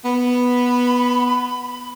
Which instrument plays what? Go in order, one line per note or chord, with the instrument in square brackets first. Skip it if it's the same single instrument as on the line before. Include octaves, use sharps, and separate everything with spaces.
[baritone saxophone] B3 [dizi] B5